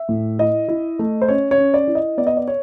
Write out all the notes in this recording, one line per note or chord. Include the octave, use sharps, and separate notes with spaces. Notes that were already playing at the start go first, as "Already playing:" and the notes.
Already playing: E5
A2
E4 D#5
E4
A3
C5
C#4 C#5
C#5
C#4
D5
E4
D#5
B3 D5
D#5
D5
C#5